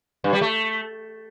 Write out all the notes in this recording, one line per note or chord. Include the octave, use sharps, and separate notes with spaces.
G2
G3
A3